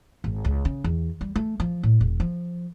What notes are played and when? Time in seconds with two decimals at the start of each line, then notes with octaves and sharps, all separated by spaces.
0.24 G#1
0.45 C#2
0.65 C#3
0.84 E2
1.21 G3
1.36 A3
1.60 F3
1.83 A2
2.01 E1
2.20 F3